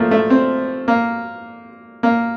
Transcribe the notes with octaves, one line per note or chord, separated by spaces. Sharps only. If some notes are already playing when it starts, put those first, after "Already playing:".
Already playing: F3 A3 A#3
A3
C4
A#3
A#3